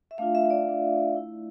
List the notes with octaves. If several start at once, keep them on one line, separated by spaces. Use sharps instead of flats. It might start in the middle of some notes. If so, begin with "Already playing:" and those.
E5
A3 D4 F4 F5
E5
E5
D5
A3 D4 F4
A3 E4